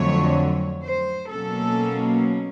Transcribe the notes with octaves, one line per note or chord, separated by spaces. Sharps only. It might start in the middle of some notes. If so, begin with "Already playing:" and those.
Already playing: F2 D3 F#3 A3 C#5
C5
B2 F#3 A#3 C#4 A4